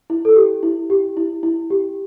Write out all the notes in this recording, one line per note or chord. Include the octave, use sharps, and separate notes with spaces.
E4
A4
G4
E4
G4
E4
E4
G4